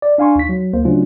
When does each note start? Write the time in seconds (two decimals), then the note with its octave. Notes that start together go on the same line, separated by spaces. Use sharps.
0.02 D5
0.18 D4 F5 G#5 C6 C#6
0.36 D#2 D#4 B6
0.49 F#3
0.73 D2 A#3 C5
0.85 C#3 F#3 A3 C#4 D4 F4